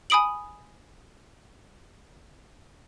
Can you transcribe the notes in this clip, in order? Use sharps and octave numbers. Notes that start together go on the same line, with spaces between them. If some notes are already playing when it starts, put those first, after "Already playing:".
G#5 B5 D#6 D7 F#7